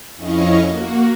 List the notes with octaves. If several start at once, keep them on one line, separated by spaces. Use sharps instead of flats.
F2 C#4 E4 D#5 F5 C#6
A#3 F#4